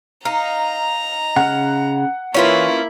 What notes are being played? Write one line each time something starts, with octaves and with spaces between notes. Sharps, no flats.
D#4 F5 A#5
C#3 F#5 F6
E3 A#3 C#4 E4 F4 B4 C#6